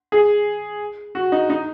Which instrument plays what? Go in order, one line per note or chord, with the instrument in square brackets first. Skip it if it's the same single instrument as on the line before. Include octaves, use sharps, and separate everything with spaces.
[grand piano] G#4
F#4
D#4
D#4